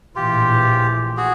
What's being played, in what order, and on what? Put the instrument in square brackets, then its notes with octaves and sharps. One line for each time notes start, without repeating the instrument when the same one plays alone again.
[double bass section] A#1 A2 E3 [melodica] F4 G4
[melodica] F#4 G#4